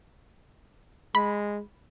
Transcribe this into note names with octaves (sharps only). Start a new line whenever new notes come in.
G#3 B5